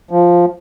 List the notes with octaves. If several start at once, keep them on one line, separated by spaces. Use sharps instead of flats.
F3